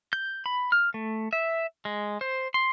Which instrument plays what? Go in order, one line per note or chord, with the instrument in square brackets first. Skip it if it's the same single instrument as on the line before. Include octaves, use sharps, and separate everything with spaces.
[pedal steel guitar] G6
B5
F6
A3
E5
G#3
C5
C6